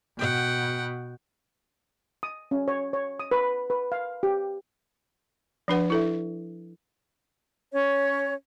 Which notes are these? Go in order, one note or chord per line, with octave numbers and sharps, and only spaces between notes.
B2 F#5 G5
D#6
C#4
C#5
C#5
D#6
B4
B4
F5
G4
F3 D4 B4 F#5
E4 A4 E5
C#4 C#5